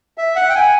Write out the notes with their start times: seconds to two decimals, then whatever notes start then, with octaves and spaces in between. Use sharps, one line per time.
0.18 E5
0.36 F#5
0.50 G5
0.55 G#5